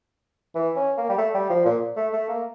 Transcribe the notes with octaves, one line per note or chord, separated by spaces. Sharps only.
E3
C#4
A#3
G3
A3
G3
F3
A#2
A3
A3
A#3